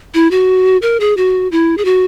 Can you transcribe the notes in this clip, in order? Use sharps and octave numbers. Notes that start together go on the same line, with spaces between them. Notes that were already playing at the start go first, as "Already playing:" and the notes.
E4
F#4
A#4
G#4
F#4
E4
G#4
F#4